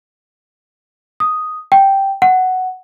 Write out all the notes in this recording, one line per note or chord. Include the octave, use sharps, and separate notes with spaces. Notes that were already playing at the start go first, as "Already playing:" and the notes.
D#6
G5
F#5